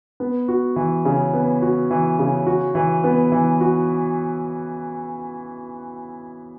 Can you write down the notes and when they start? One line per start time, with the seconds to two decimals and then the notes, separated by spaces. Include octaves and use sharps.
0.20 B3
0.48 F#4
0.76 E3
1.05 C#3
1.33 B3
1.62 F#4
1.91 E3
2.19 C#3
2.47 F#4
2.75 E3
3.04 B3
3.32 E3
3.61 F#4